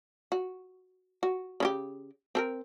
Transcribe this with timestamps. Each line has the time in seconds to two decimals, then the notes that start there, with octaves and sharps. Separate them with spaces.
0.32 F#4
1.23 F#4
1.60 C#3 C#4 G4
2.35 C4 A4 A#4